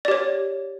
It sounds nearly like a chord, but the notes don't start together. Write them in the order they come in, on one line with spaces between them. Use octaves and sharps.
D5 G4 C#5